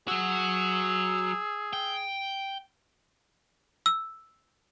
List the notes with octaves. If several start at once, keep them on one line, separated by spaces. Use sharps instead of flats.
F#3 F#4 G#4 E6
G5
E6